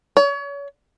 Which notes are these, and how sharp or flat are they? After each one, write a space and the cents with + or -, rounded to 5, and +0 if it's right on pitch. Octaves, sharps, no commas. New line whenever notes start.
C#5 +35